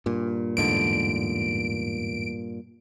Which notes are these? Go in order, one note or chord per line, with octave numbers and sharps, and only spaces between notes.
G2 A#2
E2 G#2 D3 D7